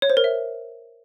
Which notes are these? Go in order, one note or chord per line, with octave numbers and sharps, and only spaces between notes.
C#5
C5
A#4
E5